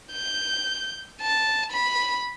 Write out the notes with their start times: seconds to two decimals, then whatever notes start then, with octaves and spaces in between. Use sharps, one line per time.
0.13 G6
1.22 A5
1.72 B5